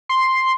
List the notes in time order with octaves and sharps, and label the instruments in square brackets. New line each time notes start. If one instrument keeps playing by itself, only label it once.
[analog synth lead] C6